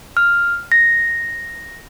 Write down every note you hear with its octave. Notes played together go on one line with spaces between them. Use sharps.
F6
A#6